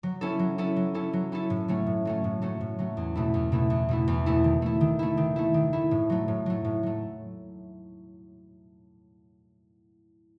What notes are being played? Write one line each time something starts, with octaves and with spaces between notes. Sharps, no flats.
F#3
C#4 E4 A4
F#3
C#4 E4 A4
F#3
C#4 E4 A4
F#3
C#4 E4 A4
A2
F#3 A3 C#4
A2
F#3 A3 C#4
A2
F#3 A3 C#4
A2
F#3 A3 C#4
E2
B2 A3 E4
E2
B2 A3 E4
E2
B2 A3 E4
E2
B2 A3 E4
D#3
A3 E4
D#3
A3 E4
D#3
A3 E4
D#3
A3 E4
A2
F#3 A3
A2
F#3 A3
A2
F#3 A3